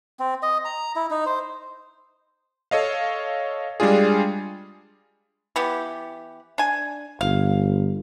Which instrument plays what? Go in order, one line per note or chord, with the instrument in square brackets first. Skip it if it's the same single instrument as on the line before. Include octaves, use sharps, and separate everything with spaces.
[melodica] C4
D#5
A#5
E4
D#4
C5
[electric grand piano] A4 C#5 D#5 F5
G3 G#3 D4 F4 G#4
[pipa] E3 B3 G4
D4 G#5
[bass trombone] G1 [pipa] F5